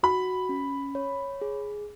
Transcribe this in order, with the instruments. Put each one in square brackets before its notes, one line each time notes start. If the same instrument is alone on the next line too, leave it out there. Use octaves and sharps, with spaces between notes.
[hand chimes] F#4 [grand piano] B5
[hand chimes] C#4
C#5
G#4